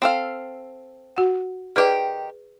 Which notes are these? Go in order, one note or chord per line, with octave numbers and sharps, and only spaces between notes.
C4 A4 F5 G5
F#4 F#5
D#3 G4 G#4 B4 D5 G5